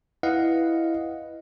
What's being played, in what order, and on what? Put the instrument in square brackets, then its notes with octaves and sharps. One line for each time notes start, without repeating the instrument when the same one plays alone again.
[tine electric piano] E4 B4 D#5 F5 F#5